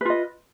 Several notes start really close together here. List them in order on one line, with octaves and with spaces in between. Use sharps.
B4 F4 D#5